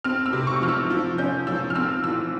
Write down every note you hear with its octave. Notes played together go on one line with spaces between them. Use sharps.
C4 F6
E6
C3
C#6
F3 F6
E6
F3
C#4 G6
F3 E6
F6
C4 E6
E3 E6